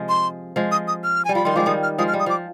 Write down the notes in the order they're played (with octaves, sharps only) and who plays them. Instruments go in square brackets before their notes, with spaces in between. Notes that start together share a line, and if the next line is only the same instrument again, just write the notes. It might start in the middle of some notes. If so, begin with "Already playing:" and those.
Already playing: [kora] C3 F3 G#3
[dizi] C6
[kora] F3 G#3
[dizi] D#6
D#6
F6
[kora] G3 [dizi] G#5
[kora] F3 [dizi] B5
[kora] D#3 G3 [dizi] C6
[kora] F3 G#3 [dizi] D6
[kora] D#3 G3 [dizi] D#6
[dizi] F6
[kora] F3 G#3 [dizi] D#6
[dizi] F6
[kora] G3
[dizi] D#6
[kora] F3 [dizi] D6